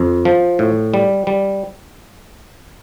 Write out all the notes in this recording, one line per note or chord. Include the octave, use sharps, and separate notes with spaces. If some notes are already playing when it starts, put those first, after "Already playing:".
Already playing: F2
F3
A2
G3
G3